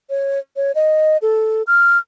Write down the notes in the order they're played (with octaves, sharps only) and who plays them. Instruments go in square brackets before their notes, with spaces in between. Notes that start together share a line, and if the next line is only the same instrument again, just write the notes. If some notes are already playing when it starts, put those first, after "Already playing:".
[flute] C#5
C#5
D#5
A4
F6